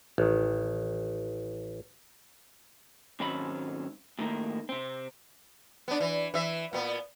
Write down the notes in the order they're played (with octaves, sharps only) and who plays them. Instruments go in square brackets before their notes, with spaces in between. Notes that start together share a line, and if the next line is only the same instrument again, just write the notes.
[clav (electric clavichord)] A1 D#3
[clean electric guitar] G#2 D#3 F#3 C4 C#4 B5
A2 D#3 A#3
C3 C4
[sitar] B3 D4
E3
E3 E5
A#2 B3